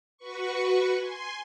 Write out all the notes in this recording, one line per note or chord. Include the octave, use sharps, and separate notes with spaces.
F#4 B4 C#6
G#5 C6